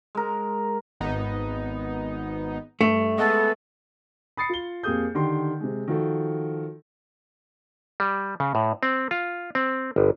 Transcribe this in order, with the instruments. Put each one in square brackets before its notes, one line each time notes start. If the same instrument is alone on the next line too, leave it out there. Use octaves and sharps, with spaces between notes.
[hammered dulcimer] G#3 A#4
[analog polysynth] G#1 B3 D#4
[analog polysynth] G2 [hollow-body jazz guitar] A3
[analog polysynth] G#3 B3 [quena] A4
[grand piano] B5 D#6 A6 C7 C#7
F4 G7
F2 A#3 G4 G#4 D#6 G6
D3 D#3 G4 C6
C3 G#3
D#3 F3 F#4 A4
[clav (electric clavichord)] G3
C#3
A2
C4
F4
C4
G1